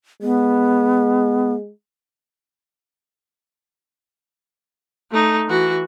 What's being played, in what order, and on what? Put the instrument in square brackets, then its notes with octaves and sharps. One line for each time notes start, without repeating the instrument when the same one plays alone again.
[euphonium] G#3 [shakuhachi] B3
[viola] A3 D#4
E3 F#4